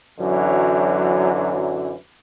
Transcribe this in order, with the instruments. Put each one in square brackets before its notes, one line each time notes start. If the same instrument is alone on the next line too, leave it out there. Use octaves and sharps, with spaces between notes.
[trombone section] F#2 D3 E3 F#3